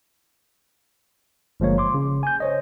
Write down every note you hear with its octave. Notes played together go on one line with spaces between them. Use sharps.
G1 F3 G#3 A#3 C#5
C6 D6
C#3
G#5 G6
C5 C#5 D#5